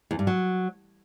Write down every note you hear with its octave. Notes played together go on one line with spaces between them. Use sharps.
E2
G2
F#3